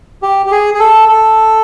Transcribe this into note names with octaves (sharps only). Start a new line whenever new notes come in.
G4
G4
G#4
G#4
A4
A4